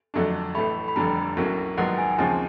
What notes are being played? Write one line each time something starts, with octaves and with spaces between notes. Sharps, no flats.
F2 D3 F#3 A3 D4
A1 A2 E3 A3 B5
B5
F1 F2 D3 G3 A#5
B1 A2 F#3 A#3 C#4
A#1 G#2 D#3 F#3 B3 F#5
G#5
D#2 C#3 F3 G#3 C4 A5